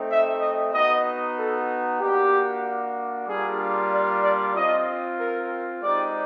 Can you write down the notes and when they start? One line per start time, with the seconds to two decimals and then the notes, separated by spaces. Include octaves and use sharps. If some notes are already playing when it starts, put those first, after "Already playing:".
Already playing: A3 C4 D#4
0.10 E5
0.40 D#5
0.72 B3 D#4 F#4 D#5
1.37 A4
2.00 A#3 D4 F#4 G4
3.27 G3 A#3 D4 F4 G#4
3.91 D5
4.23 D5
4.55 C4 F4 D#5
5.19 A#4
5.82 G#3 C4 D#4 G4 D5